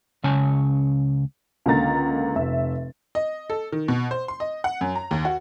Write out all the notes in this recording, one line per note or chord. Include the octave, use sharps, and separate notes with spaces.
C#2 C#3 C#4 C#5 G#5 A5
C#2 D3 A#3 A#5 A6
F1 E5
D#5
A4
D#3
B2
C5
C6
D#5
F#5
F#2
A#5
D#2
F#4